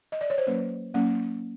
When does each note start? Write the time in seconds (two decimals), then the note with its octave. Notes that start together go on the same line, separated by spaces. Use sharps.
0.12 D#5
0.21 D5
0.30 C#5
0.38 C5
0.47 F#3 A#3 C#4 B4
0.94 F#3 A#3 C#4